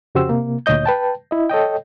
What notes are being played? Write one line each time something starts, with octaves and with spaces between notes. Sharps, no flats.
F2 C#3 F#4 G4 C5 E6
C3 A#3
D2 A#2 C#5 D#5 G6
B4 G5 A5
E4 D#5
A4 C#5 D#5 G5